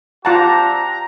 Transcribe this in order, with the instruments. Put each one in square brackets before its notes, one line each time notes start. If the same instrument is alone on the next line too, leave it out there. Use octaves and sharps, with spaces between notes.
[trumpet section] C4 D4 G4 [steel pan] F4 F#5 A5 [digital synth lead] A#5